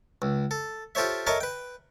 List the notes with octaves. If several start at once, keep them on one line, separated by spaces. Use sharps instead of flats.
C#2
A4
F4 G4 A4 C5 C#5 E5
A4 A#4 C#5 D#5 E5 A5
B4 G5